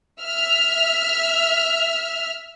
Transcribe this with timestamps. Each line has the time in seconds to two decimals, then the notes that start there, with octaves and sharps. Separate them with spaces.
0.22 E5 F6